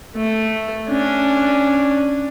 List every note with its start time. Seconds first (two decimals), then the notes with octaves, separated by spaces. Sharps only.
0.16 A3
0.89 C#4 D4